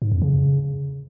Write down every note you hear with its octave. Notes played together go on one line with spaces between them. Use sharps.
G#2
F2
C#3